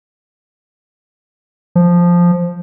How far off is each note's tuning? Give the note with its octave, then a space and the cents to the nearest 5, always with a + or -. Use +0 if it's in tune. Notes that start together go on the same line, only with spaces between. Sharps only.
F3 +0